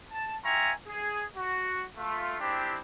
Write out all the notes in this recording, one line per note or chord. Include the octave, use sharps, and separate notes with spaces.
A5
F4 E5 G5 G#5 A#5 C#6
G#4
F#4
A3 F4
G#3 C4 D4 E4 G4